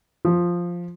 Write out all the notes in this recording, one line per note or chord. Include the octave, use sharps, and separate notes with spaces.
F3